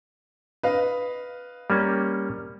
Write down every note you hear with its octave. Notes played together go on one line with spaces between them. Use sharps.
B4 D#5 F5
G3 A#3 C#4